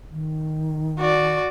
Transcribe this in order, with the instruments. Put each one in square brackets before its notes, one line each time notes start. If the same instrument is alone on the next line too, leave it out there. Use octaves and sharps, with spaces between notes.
[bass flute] D#3
[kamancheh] F#4 D5